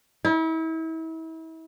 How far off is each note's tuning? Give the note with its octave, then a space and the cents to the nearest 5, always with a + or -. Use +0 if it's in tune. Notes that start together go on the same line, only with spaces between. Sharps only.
E4 -35